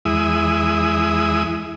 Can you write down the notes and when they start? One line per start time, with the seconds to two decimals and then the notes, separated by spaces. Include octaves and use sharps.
0.05 E2 G#3 E4 D#6